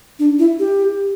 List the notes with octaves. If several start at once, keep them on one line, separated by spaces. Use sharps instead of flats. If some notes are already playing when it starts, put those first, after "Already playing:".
D4
E4
G4